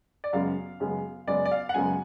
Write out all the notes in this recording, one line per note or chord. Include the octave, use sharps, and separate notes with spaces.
D5
F#2 C#3 G#3 B3 F5
F#2 C#3 G#3 B3
F#2 C#3 G#3 B3 D5
D5
F5
F#5
F#2 C#3 G#3 B3 G#5